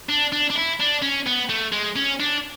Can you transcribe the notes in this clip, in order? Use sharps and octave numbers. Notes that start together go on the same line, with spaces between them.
D4
D4
D4
E4
D4
C#4
B3
A3
G#3
C#4
D4